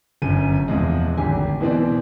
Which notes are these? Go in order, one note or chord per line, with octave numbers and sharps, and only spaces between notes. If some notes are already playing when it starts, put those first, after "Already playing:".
G1 F#2 D#7
E2 C3 F3 G#3
G#1 D2 G4 G#5
B2 E3 C4 D5